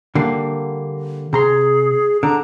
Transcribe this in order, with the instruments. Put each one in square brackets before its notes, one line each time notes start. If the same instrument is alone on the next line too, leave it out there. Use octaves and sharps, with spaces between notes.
[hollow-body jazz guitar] D3 G3 A#3
[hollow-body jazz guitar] C3 A#5 C6 [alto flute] G#4
[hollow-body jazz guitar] D3 D4 [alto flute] A#5